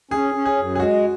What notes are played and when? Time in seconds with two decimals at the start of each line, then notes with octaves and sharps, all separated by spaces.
0.11 C#4 G#4
0.34 C#4
0.45 G#4
0.57 F#2
0.75 G#4
0.79 G#3 F#4